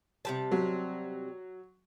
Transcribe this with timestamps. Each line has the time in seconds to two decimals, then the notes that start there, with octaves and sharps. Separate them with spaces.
0.25 C3 G3 A5
0.52 F#3